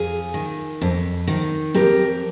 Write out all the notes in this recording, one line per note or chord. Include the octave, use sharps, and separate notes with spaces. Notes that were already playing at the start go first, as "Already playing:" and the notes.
Already playing: F2 F4 G#4
D#3
F2
D#3
F2 G4 A#4